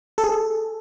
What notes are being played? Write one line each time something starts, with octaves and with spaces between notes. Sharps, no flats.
A4
G#4
A4